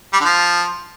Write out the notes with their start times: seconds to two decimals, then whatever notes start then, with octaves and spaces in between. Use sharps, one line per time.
0.13 G3
0.20 D3
0.24 F3